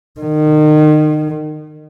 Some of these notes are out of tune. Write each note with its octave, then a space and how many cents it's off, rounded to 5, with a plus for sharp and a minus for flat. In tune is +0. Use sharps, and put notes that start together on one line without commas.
D#3 -30